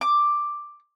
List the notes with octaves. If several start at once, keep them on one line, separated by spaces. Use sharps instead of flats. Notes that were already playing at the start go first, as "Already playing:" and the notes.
D6